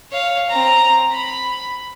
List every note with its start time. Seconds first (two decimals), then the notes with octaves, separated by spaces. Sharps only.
0.11 C#5 F5
0.50 C4 A#5
1.12 B5